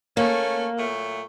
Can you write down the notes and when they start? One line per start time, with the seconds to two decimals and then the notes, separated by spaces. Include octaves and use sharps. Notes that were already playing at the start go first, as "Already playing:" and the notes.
0.17 A3 A#3 C#4
0.76 A#2 F#3 A3